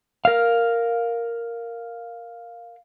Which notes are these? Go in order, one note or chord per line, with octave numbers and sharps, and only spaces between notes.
A#4 F5